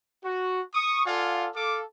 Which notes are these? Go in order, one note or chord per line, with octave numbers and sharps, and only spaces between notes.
F#4
C#6 D#6
F4 A4 D5 F5 F#5 G#5
A4 F5 D6